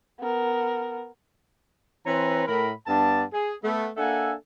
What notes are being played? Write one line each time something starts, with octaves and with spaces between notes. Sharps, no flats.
B3 A#4
E3 C4 B4 C#5 A#5 C6
A2 A#4 B5
G2 B3 D4 A5
G#4
A3 B3
A#3 D4 A4 E5 F#5 G#5